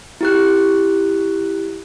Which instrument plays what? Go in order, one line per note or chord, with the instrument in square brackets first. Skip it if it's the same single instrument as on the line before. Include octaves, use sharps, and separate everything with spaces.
[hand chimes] E4 G4 F#6